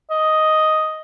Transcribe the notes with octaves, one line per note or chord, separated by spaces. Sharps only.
D#5